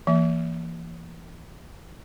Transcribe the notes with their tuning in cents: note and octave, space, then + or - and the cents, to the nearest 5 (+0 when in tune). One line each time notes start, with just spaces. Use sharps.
E3 +25 A#3 +0 E5 +0